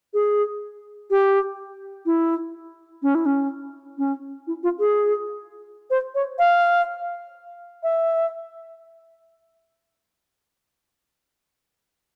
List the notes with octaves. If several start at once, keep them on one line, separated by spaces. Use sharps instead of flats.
G#4
G4
E4
C#4
E4
C#4
C#4
E4
F4
G#4
C5
C#5
F5
E5